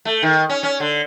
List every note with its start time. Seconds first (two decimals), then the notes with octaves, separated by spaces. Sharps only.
0.05 A3
0.22 D#3
0.50 C#4
0.63 C#4
0.80 D3